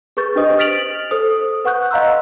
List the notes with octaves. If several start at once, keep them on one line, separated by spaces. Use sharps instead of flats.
G#4 B4 C#6 G6 A6
D4 G4 B4 C5 D#5 D#6
F6 A6 B6 D7 F7 F#7
A4 C5 D#6
B4 F#5 C#6 F#6 G6
D#5 F5 A#5 C6 E6